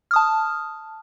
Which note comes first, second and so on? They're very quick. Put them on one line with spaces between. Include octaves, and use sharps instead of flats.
F6 D#6 A5